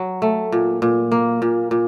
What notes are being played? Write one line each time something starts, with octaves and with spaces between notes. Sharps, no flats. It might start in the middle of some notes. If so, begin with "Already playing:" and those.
Already playing: F#3
A3
A#2
A#2
A#3
A#2
A#2